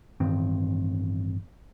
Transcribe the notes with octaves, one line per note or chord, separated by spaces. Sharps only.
A1 G2 D#3 C4